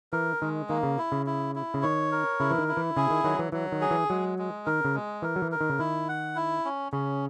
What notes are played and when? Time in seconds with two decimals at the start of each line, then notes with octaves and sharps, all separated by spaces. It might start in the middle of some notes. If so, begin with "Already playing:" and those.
0.13 E3 A#4
0.41 D#3 G#3
0.69 D#3 A#3
0.83 C#3
0.98 E4
1.12 C#3
1.26 E4
1.55 E4
1.74 C#3
1.82 D#3 C#5
2.12 A#4
2.40 C#3 E4
2.51 E3
2.58 D#3
2.68 E4
2.77 E3
2.97 C#3 G#4
3.10 D#3
3.24 D#3 F#3
3.39 E3
3.52 E3 F#3
3.72 D#3
3.81 G#4
3.91 E3
4.10 F#3 G#3
4.38 G#3
4.66 D#3 A#4
4.85 C#3
4.95 G#3
5.22 E3 A#4
5.36 F#3
5.42 E3
5.52 A#4
5.61 D#3
5.70 C#3
5.79 D#3 E4
6.08 F#5
6.36 E4
6.65 C#4
6.92 C#3 C#4